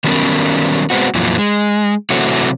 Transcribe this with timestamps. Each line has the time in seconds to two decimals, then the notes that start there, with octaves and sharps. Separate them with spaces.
0.04 D#3 F#3 G3 B3 C#4 A#4
0.90 G#3 B3 C4 F#4
1.15 F2 A#2 E3 F#3
1.39 G#3
2.10 C3 E3 F#3 A3 F#4